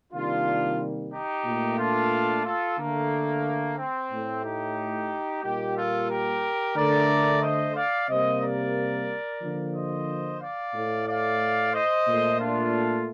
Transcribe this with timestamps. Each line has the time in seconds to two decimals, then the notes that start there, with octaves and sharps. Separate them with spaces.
0.12 C3 D#3 G3 A#3 D4 F4
1.12 D#4 G4
1.45 A#2 A3
1.78 D4 F4
2.44 F4 A4
2.77 D3 A3 A#3
3.77 C4
4.10 A2 A3
4.44 D#4 G4
5.43 A#2 G3 A#3 D#4 G4
5.76 F4 A4
6.09 G4 A#4
6.76 D3 A3 A#4 D5
7.42 C5 D#5
7.75 D5 F5
8.08 C3 G3 A#3 C5 D#5
8.41 A#4 D5
9.42 D3 F3 A#3
9.74 C5 D#5
10.40 D5 F5
10.74 A2 A3
11.07 D5 F5
11.73 C5 D#5
12.07 A#2 A3
12.39 D4 F4